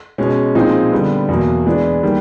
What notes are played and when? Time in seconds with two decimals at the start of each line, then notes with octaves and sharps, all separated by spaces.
0.18 B2 G#3 C#4
0.55 A#2 F3 G#3 C4 D#4
0.92 D3 G3 B3
1.29 E2 B2 F#3 A#3
1.66 E3 G#3 B3 D4
2.03 D#3 G3 A#3